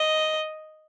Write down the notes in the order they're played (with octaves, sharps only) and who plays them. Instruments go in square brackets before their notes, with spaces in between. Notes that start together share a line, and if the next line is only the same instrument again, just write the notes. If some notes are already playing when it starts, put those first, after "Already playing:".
Already playing: [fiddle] D#5